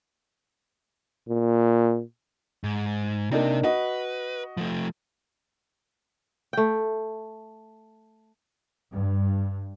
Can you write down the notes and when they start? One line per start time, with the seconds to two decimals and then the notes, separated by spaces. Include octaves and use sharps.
1.29 A#2
2.64 G#2
3.31 C3 A#3 D4 D#4
3.64 F#4 B4 D#5
4.57 F3 A3
6.53 A3 G5
8.91 G2